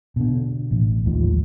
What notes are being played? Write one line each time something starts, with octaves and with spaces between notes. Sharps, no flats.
B2 D3
A1
A1 D#2 G#2 F3